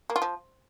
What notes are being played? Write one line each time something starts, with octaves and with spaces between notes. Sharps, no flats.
A#3
F4
F3